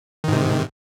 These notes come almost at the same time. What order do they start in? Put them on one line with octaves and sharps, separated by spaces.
D#3 G#2 C3